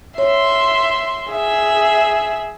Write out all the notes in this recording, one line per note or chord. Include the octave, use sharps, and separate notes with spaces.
C#5 E5 C6
G#4 E5